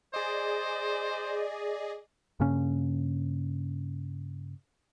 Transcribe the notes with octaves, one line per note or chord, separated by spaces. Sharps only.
G#4 C5 D5 D#5
G2 C#3 A#3 C#4